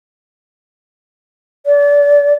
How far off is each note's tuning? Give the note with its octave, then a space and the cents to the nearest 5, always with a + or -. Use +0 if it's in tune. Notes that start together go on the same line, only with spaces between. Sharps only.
D5 -30